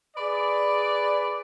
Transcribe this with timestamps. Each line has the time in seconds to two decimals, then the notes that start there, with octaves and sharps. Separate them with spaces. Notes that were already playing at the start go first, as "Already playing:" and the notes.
0.16 G#4 B4 D5